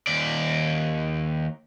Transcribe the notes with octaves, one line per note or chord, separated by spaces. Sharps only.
D#2 D5